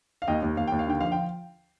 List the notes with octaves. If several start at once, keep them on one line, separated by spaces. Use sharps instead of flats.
F5
D#2 D#5 G5
D#2
D#2 F5
D#2 G5
F5
D3 G5
F3 F5
G5